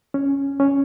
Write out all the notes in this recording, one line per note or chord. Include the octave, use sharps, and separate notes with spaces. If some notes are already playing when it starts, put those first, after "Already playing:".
C#4
C#4